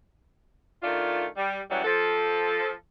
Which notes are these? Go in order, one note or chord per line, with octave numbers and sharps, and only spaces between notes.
D#3 A3 D4 F4
G3
C#3 E3 F#3 G3 F#4
F3 A4